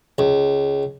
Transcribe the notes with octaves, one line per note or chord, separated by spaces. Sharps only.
C#2